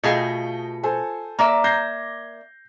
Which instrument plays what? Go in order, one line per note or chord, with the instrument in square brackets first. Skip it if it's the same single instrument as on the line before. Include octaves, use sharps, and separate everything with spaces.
[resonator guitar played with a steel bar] B2 A3 G#4 [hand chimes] F4 C#7 [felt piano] D#5 F5 G5
[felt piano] A4 C5 G#5
[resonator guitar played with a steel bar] A#3 D5 E5 [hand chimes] A#5
[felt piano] G6 A#6 C7 [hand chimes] G#6